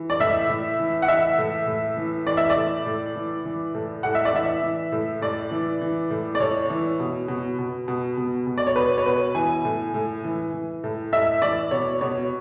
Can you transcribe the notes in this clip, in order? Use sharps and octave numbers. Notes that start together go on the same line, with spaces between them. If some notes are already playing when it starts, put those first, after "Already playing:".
Already playing: E3
D5
A2 E5
A2
E3
F#5
E3 E5
A2
A2
E3
E3 D5
E5
D5
A2
A2
E3
E3
A2
A2 F#5
E5
D5
E3 E5
E3
A2
A2 D5
E3
E3
A2
D5
A2 C#5
E3
B2
B2
B2
B2
B2
B2
D5
C#5
B2 B4
C#5
B2 B4
E3 G#5
A2
A2
E3
E3
A2
A2 E5
E3 D5
B2 C#5
B2 C#5